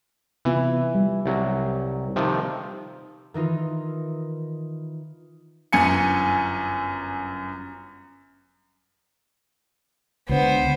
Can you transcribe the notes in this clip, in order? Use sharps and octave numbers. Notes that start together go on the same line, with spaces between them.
C3 E3 B3 F4
G3
C2 F#3
C3 D#3 F3
D#3 E3 D#4 F4
G1 F#2 G#5 C#7
C#2 D3 B3 C5